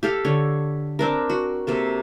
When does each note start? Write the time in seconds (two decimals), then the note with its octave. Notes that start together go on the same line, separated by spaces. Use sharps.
0.03 G4 A4 F5
0.25 D3 C#5
0.99 C4 D4 A#4
1.30 F#4
1.67 C3 A#3 A4